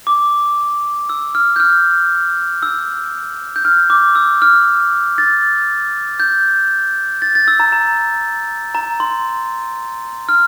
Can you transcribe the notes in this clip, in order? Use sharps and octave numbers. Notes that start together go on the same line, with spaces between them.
D6
E6
F6
G6
F6
E6
G6
F6
D6
E6
F6
A6
G6
A6
A6
E6
A#5
A#5
A#5
C6
F6